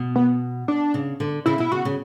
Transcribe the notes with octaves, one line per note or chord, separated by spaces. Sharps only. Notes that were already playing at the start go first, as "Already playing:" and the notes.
Already playing: B2
B3
D4
C#3
D3
C#3 E4
B2 E4
C#3 F#4
C#3